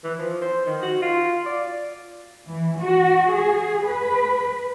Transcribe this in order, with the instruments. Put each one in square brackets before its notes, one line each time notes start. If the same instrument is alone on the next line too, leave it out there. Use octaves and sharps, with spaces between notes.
[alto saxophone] E3
F3
C5
D#3
F#4
F4
D5
[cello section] E3
F#4
G#4
B4